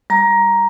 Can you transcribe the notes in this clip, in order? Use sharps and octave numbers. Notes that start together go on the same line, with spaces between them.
G3 A#5